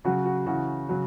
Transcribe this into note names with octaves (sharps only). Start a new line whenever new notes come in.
C#3 F#3 F#4
F#4
C#3 E3 F#4
C#3 F#3